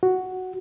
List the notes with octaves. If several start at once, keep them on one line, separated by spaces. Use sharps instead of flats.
F#4